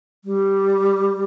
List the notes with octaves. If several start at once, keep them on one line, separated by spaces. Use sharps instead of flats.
G3